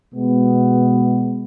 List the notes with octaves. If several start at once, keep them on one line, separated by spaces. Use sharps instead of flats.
B2 G#3 B3